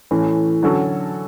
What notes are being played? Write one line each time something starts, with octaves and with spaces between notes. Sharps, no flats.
A2 E3 A3 C#4
D3 F#3 C#4 F#4 A4